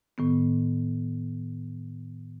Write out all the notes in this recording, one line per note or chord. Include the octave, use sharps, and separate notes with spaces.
A2 D#3 B3